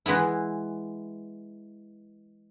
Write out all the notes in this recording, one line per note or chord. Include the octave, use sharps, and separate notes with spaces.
E3 G#3 B3 E4